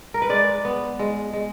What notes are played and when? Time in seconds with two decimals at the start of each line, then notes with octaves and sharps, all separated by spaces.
0.14 A#4
0.22 B4
0.29 G#3 D5
0.65 B3
0.99 G#3
1.33 G#3